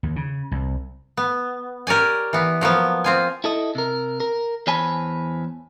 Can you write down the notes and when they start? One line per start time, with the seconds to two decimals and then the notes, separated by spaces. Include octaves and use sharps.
0.03 D#2
0.16 C#3
0.52 C2
1.17 B3
1.87 G4 A#4 C#5 D5 G#5
2.33 E3 B3
2.61 F3 F#3 A#3 B3
3.04 C4 F4 G#5
3.44 E4 A4 D#5
3.75 C3 A#4
4.20 A#4
4.67 E2 C5 C#5 G#5 A5 B5